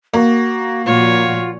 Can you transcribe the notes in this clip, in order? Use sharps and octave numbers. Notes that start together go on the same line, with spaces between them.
A#3 F#4
A#2 F3 F4 F#4 C#5